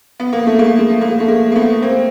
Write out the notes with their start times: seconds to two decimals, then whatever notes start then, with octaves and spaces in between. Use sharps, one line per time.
0.20 B3
0.33 A#3
0.47 A3
0.59 G#3 A#3
0.79 G#3
0.90 A3
1.01 G#3 A#3
1.20 A3
1.28 G#3 A#3
1.52 A#3
1.55 A3 B3
1.82 A#3 C4